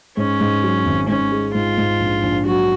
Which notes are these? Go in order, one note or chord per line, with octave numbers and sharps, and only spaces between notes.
G#2 C#4
G#2
F#3
G#1
G#2 C#4
G#3
G#2 F4
G#2
A#1
A#1
F#3 F#4